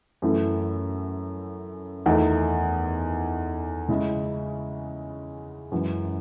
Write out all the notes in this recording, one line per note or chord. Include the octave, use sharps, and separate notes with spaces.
F#2 E3 A3 C#4 E4
E2 D#3 A3 D#4
C#3 G#3 C#4 E4
F#2 E3 G#3